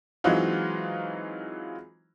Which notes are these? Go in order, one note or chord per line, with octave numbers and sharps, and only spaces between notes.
E3 F#3 G#3 C4 D#4 F4